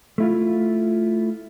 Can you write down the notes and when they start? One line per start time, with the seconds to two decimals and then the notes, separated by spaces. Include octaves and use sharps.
0.18 A3 E4 F4